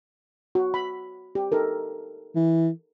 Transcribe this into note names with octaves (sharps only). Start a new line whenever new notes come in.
F#4
B5
G4
D#4 A4 A#4
E3